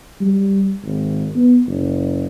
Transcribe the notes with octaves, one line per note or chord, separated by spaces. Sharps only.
G3
G#1
B3
F#1